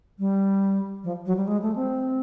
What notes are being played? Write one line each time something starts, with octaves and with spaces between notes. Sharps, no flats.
G3
F3
F#3
G3
G#3
A3
C4